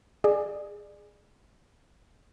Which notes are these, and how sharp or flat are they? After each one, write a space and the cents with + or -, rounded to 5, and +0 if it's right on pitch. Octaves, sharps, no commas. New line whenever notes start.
G#4 +0 D5 +30